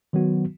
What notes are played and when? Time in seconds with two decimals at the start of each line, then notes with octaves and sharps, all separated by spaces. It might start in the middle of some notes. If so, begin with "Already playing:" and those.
0.13 D#3 F#3 B3 F#4